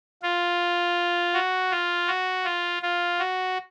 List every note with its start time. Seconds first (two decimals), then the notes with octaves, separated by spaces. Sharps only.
0.23 F4
1.34 F#4
1.71 F4
2.07 F#4
2.44 F4
2.82 F4
3.19 F#4